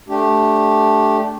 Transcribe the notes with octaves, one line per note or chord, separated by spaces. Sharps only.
A3 D4 G4